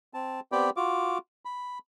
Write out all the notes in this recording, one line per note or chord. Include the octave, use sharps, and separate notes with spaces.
C4 A5
B3 C4 G4 D5 G5 B5
F4 F#4 D6
B5